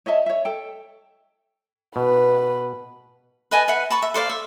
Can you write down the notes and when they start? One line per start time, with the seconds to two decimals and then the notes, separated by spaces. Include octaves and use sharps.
0.06 C#5 D#5 E5 A5
0.26 C#5 E5
0.45 A4 G5
1.96 B2 B4
3.51 B4 D#5 G#5 A5
3.68 B4 E5 F#5
3.91 A5 B5 C#6
4.02 E5
4.14 A4 C5 D5 F5
4.29 E5